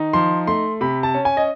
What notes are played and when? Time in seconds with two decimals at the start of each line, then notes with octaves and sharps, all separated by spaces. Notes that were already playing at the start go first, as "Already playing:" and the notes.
Already playing: D#3 D#4
0.13 F3 C6
0.47 A3 C6
0.81 C3 B5
1.03 A5
1.14 C#4
1.25 G#5
1.37 D#5